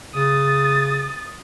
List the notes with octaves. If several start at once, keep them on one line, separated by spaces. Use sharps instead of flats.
C#3 D#6 A6